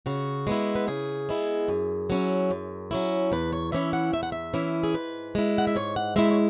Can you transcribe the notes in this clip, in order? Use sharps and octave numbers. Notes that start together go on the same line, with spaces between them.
C#3 F#4
G#3 B3 E4
B4
C#3 G#4
G#3 B3 E4
F#2
F#3 C#4 E4
F#2
F#3 C#4 E4
E2 B4
C#5
E3 C#4 E4 E5
F#5
E2 E5
F#5
E5
E3 C#4 E4
G#4
G#2 B4
G#3 E4
F#5
E5
G#2 C#5
F#5
G#3 E4 E5
C#5